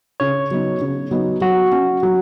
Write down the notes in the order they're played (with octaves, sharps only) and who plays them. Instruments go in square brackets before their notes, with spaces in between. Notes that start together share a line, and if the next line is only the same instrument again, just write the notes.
[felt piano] C#3 [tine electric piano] C#5
[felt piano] F#3 B3 D#4
C#3
F#3 B3 D#4
[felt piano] F#3 [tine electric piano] F#4
[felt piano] C#4
F#3